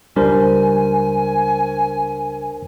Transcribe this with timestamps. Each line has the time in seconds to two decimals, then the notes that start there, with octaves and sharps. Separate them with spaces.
0.16 C#2 G3 D4 A#4 C5 G#5